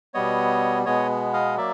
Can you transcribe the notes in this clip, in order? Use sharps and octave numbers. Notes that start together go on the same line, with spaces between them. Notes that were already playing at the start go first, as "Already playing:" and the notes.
B2 G3 B3 C#5 D#5
B2 G#3 B3 C#5 D#5
D#5 F5
F#3 A#3 D5 E5